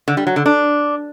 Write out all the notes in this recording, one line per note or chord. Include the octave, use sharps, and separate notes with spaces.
D3
G3
F#3
D3
D4